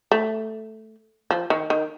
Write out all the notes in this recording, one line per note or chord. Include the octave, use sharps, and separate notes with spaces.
A3
F3
D#3
D#3